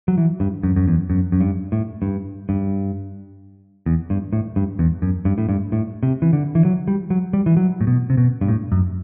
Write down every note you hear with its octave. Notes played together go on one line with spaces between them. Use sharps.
F#3
E3
G2
F#2
F#2
E2
F#2
F#2
G2
A2
G2
G2
E2
G2
A2
G2
E2
F#2
G2
A2
G2
A2
C3
E3
D3
E3
F#3
G3
F#3
G3
E3
F#3
A2
B2
C3
B2
G2
A2
F#2